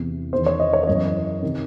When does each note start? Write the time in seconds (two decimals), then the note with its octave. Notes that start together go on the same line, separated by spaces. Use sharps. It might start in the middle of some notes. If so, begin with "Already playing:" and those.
Already playing: E2 C3 E3
0.33 E2 D#3 C5
0.46 C#5
0.60 D#5
0.73 C#5
0.83 C#5
0.87 F#2 C#3 E3 D#5
1.42 C3 D#3